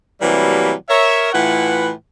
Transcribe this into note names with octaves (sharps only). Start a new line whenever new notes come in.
C3 E3 F#3 G3 A3 A#3
A#4 C#5 E5
A2 E3 F4 B4 F#5